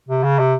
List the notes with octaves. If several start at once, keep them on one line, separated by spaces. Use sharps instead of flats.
C3
C#3
C3